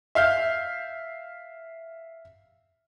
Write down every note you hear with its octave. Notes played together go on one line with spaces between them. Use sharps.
E5 F5 F6 G6